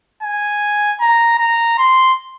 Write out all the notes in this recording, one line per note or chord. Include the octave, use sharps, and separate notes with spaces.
G#5
A#5
A#5
C6